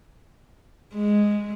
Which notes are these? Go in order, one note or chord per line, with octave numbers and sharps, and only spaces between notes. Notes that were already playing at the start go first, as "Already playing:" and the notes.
G#3